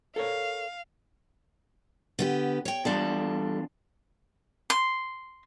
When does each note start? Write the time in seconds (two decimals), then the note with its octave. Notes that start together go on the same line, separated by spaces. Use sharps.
0.16 A4 A#4 C#5 F5
2.19 D3 B3 G4
2.65 C#5 G5
2.85 E2 G3 D4 F4 A4
4.70 C6